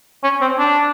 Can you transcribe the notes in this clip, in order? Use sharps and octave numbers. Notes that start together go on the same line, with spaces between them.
C#4
C4
D4